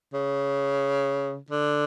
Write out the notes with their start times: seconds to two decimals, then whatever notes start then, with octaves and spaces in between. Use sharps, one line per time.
0.14 C#3
1.50 D3